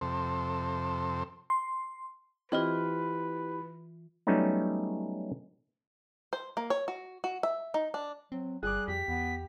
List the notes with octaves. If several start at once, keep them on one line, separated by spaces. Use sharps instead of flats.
F2 C3 A4 C5
C6
E3 C4 E4 F4 G4 B4 D#5
F#3 G3 A3 B3 C#4 D#4
C5
A#3
C#5
F#4
F#4
E5
D#4
D4
F#3 C4
G1 G3 G#4 D6 F#6
F2 G4 B6
E2 B3